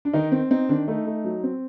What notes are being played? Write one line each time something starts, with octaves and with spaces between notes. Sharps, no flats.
D4
D#3 D#4
C4
C4 D#4
D#3 D4
A3 D#4
A3
F#3
C4